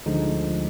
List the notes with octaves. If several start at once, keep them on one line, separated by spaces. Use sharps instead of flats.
D2 D3 F3 G#3 D#4